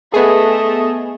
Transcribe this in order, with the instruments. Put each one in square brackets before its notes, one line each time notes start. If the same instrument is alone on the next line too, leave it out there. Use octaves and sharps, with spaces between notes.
[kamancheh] A3 D#5 [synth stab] B3 G#4